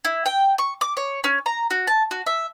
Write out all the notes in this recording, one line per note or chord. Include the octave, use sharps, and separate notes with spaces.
E4
G5
C#6
D6
C#5
C#4
A#5
F#4
A5
F#4
E5